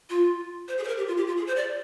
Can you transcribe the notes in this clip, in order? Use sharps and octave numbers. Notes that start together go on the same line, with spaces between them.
F4
C5
G#4
C5
A#4
G4
F4
G4
F4
G#4
C5
D5